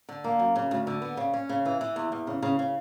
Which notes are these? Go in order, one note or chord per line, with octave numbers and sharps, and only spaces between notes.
D3
A#3
F#2
C#3
D2
D3
B3
C#3
C#4
C#3
E3
E3
E2
E2
C#3
C#3
C#3